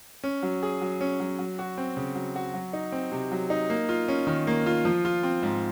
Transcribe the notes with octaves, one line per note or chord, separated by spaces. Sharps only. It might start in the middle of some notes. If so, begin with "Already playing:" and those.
C#4
F#3
G#4
F#3
C#4
F#3
F#3
F#4
C4
C#3
F#3
F#4
F#3
D#4
C4
C3
F#3
D#4
A#3
F4
C#4
D#3
A#3
F4
F3
F4
C4
G#2